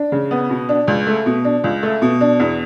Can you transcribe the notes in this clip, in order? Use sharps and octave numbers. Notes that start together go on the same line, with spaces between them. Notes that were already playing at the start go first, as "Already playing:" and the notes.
Already playing: D4
C#3
B3
B2
D4
C#2
A3
B2
D4
C#2
A3
B2
D4
E2